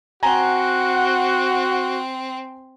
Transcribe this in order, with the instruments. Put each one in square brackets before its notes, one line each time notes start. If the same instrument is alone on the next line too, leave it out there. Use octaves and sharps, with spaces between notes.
[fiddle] C4 [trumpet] F#4 [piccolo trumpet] F#5 [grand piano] G#5 A#5